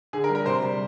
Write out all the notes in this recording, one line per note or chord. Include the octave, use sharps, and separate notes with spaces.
D3 G#4
A#4
G3
A#4
C3 C5
G3